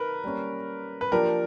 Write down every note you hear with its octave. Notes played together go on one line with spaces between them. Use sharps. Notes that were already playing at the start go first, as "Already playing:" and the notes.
Already playing: D#4 A#4 B4
G3 A#3 C#4
B4
F3 A#3 D4 G4 A#4